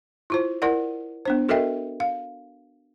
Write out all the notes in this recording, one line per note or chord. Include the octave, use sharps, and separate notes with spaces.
E4 F4 C5
E4 A#4 D5 F#5
B3 D4 C5
F#4 A4 A#4 D#5 E5 G5
F5